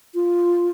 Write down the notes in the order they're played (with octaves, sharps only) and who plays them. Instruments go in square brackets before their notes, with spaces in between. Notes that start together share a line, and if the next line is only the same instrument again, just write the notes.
[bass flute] F4